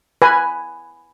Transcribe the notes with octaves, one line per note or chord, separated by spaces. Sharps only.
B4 G#5